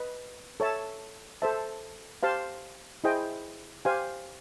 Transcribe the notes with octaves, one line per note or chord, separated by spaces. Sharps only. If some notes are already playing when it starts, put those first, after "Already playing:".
Already playing: B4 D#5
A4 C#5 E5 A5
A4 C5 E5 A5
G4 C5 F5 A5 C6
E4 G#4 C5 D#5 G5
G4 C5 F5 G#5